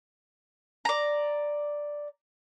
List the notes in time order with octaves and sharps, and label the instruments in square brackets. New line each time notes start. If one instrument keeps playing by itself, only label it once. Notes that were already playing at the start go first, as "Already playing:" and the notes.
[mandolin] D5 A#5